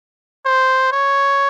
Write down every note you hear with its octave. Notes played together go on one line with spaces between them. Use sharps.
C5
C#5